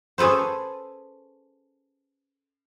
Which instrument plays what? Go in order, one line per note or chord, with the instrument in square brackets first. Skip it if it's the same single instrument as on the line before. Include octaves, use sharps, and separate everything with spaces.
[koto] C#4 G#4 A4 B4 C5